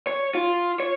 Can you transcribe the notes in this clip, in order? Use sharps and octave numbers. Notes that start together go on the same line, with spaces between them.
C#5
F4
C#5